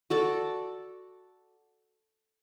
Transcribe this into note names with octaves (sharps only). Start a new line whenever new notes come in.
F#4 A4 D5